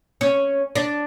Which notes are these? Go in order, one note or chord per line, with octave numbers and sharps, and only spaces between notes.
C#4
D4